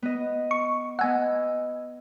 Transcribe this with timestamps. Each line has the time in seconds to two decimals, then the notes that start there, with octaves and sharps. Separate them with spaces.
0.02 B3 D#5
0.51 C#6
0.99 B3 D#5 F#5 G#5 E6